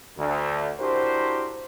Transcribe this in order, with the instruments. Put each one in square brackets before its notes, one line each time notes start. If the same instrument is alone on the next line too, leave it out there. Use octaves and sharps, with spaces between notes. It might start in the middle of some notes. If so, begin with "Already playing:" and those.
[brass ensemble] D2
D4 E4 F#4 G4 A#4 C5